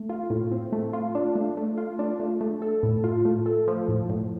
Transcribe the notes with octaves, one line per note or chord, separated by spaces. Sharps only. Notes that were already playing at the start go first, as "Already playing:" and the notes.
Already playing: A3
F4
A2
C4
A3
F4
D4
A3
A3
F4
D4
A3
A3
A4
A2
F4
A3
A4
F3
A2
A2